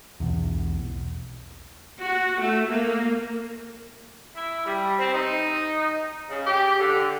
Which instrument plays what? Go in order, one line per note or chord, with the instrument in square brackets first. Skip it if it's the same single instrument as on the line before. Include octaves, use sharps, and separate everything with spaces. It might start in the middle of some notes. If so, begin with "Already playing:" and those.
[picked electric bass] B1 E2
[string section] F#4
A3
A#3
[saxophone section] E4
G3
C4
D#4
C#3
G4
D3